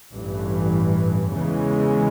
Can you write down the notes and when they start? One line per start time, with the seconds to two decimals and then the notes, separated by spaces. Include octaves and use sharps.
0.12 A1 G2 E3
1.34 E2 C#3 E3 G#3